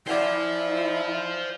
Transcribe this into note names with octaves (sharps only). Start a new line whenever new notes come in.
E4 C5 D5 F5 F#5 G#5